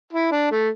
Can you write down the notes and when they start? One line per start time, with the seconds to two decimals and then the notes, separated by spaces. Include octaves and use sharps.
0.13 E4
0.32 D4
0.52 A3